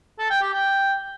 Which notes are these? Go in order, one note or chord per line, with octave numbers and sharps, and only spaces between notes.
A4
G5
G4
G5